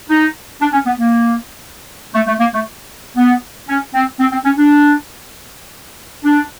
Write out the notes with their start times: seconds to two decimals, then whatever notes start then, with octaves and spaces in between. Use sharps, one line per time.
0.10 D#4
0.61 D4
0.73 C#4
0.86 B3
0.99 A#3
2.14 A3
2.27 A3
2.40 A#3
2.53 A3
3.17 B3
3.69 C#4
3.94 C4
4.20 C4
4.32 C4
4.45 C#4
4.58 D4
6.24 D4